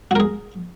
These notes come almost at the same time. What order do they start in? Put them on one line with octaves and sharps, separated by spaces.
F#4 A#4 G#4